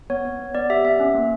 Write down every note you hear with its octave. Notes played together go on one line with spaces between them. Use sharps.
B3 C#5
B3
B3
B3 D5
G4 E5
B3 E5
C#4
A#3